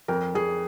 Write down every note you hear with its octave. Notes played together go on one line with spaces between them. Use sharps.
F2 A#4
F2 G#4